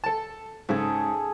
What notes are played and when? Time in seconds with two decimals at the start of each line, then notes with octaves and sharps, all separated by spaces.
0.04 A4 A5
0.69 G#2 C#3 G#4 A4